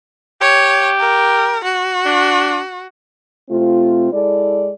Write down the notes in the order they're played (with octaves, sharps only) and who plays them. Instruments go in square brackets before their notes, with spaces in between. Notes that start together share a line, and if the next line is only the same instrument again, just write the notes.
[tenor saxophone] G4 [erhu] C#5
[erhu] A#4
F#4
[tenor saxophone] D4
[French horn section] C3 A3 C4 F4
G#3 E4 A4 D5